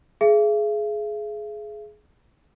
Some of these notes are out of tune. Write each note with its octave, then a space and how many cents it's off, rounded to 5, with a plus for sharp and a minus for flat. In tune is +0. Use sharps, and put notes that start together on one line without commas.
G#4 +20 E5 +45